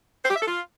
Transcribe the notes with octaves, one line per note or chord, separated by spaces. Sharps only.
C5
G4
E5
A4
F4